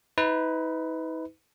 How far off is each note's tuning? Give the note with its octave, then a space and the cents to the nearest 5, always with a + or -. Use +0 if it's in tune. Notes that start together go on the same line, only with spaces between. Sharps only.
D#4 +45 B4 +20